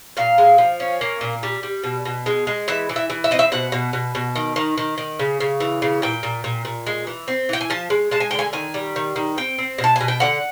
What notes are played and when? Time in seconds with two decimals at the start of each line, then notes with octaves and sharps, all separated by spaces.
0.17 A#2 F5
0.38 G#3
0.58 F3
0.80 C#4
1.01 A#3
1.21 A#2
1.43 G3
1.63 G3
1.84 B2
2.05 B2
2.26 G#3
2.47 G#3
2.68 E3 E5
2.89 E3
2.96 E5
3.10 E3
3.24 E5
3.31 C4 D#5
3.39 E5
3.52 B2 F#5
3.72 B2
3.93 B2
4.15 B2
4.36 D#3
4.56 D#3
4.78 D#3
4.98 D#3
5.19 C#3
5.40 C#3
5.60 E3
5.82 C#3
6.02 A#2 G5
6.23 A#2
6.44 A#2
6.65 A#2
6.87 G#3
7.07 E3
7.28 C4
7.49 E3 G5
7.61 G#5
7.70 F3 A5
7.90 G#3
8.11 G#3 A5
8.20 G#5
8.31 D3 G5
8.39 G#5
8.53 D#3 G#5
8.74 G3
8.96 D#3
9.16 D#3
9.38 C4 G5
9.58 C4
9.78 B2
9.84 A5
9.96 B2 G#5
10.08 G5
10.20 D3 F#5